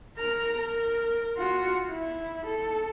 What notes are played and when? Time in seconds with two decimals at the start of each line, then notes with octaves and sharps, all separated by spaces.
0.17 A#4 A#5
0.57 A#4
1.37 F4 F#4
1.90 E4
2.46 A4